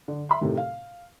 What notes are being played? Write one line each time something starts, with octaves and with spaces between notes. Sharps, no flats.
D3
E5 B5 C6
A2 C3 D#3
F5